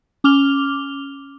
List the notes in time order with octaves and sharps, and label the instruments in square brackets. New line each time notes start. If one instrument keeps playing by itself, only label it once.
[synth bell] C#4 D6 F6 F7 G7